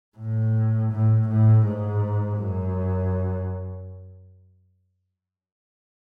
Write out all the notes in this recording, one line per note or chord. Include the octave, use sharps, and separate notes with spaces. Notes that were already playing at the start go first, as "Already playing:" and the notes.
A2
A2
A2
G#2
F#2